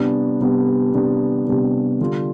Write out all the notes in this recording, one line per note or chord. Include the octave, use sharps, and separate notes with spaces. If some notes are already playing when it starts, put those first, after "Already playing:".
Already playing: C3 G3 B3 D4
C3 G3 B3 D4
C3 G3 B3 D4
C3 G3 B3 D4
D3 G3 D4 F4